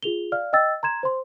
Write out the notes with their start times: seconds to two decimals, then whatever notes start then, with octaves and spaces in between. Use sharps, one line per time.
0.03 F4 G#4 F7 G7
0.32 D5 F5 F6
0.53 D#5 G5 E6 A6
0.83 A#5 C6 G#6 E7
1.03 C5 C6